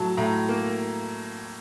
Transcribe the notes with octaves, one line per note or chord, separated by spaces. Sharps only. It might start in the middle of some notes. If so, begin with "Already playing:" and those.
Already playing: A2 F#3 A5
A2 A#5
A#3